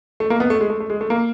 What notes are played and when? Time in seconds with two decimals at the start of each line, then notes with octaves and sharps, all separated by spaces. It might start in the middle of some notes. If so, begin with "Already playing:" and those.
0.20 A3
0.30 A#3
0.40 B3
0.50 A3
0.61 G#3
0.70 A3
0.80 A3
0.90 G#3
1.01 A3
1.10 A#3